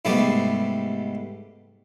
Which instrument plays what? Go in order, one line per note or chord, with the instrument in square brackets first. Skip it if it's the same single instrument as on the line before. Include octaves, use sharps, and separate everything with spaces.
[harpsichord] G#2 C3 G3 A3 B3 D5